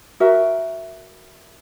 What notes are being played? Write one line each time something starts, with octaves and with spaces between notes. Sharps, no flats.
F#4 A#4 E5